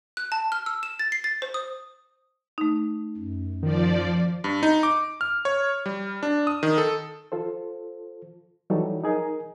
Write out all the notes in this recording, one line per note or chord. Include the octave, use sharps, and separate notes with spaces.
F#6
A5
F6
E6
E7
A6
C7
A6
C5
D#6
A3 D#4
F#2
D#3 F3 D5
G2
D#4
D6
F6
C#5
G3
D4
D#6
D#3
A4
F4 A4 C5
E3 F#3 G3 D#4 A4 C#5
D#4 G#4 A#4 G#5